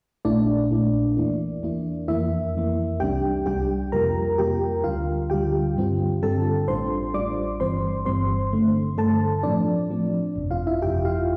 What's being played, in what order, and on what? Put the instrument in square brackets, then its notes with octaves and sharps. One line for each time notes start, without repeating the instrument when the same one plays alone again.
[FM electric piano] A#1 A#2 A3 D4 E4 D5
A#1 A#2 A3 E4
E2 E3 A#3 E4
E2 E3 A#3 E4
F2 E3 A#3 E4 E5
F2 E3 A#3
C2 C3 G3 D4 G4 G5
C2 C3 G3 D4 G4 G5
F2 C3 G3 A#3 F4 A#4 A#5
F2 C3 G3 A#3 F4 G4 G5
D2 D3 G3 F4 F5
D2 D3 G3 G4 G5
G2 D3 G3 C4 F4
G2 D3 G3 C4 F4 A4 A5
A1 A2 G3 D4 F4 C5 C6
A1 A2 G3 D4 F4 D5 D6
G1 G2 E3 G3 C4 C5 C6
G1 G2 E3 G3 C4 C5 C6
G2 D3 A3
G2 D3 A3 A4 A5
A2 F3 C4 D4 D5
A2 F3 C4
G1 F2 C3
F4 F5
E4 E5
G1 F2 C3 G4 G5
F4 F5